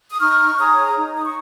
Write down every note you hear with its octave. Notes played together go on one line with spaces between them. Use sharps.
D#6
D#4 C#6 F6
G#4 C#5 A#5 D#6
D#4
D#6
C#6